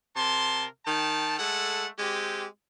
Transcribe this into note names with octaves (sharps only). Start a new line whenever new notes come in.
C3 A#4 A5 C6
D#3 G5 A5
G#3 A3 A4 F#5
G#3 C4 G4